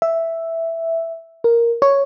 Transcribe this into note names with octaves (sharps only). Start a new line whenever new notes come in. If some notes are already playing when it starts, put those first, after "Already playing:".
E5
A#4
C#5